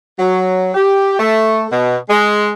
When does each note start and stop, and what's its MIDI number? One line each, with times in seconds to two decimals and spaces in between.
0.18 0.71 54
0.75 1.16 67
1.18 1.66 57
1.70 1.97 47
2.09 2.50 56